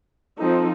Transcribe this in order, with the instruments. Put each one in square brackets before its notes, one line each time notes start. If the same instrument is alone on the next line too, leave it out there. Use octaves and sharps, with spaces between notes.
[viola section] F3 C4 D#4 A4